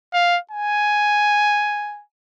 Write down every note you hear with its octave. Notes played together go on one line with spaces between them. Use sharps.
F5
G#5